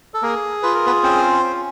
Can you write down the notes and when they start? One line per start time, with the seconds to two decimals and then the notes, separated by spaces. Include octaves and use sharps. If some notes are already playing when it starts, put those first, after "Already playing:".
0.14 A4
0.22 A#3 G#4 A#4
0.63 F4 B4
0.74 A#4
0.86 B3 B4
1.03 C4 C#4 C5
1.44 C#4